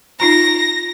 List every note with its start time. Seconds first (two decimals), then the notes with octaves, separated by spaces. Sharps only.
0.20 D#4 F4 A#5 A#6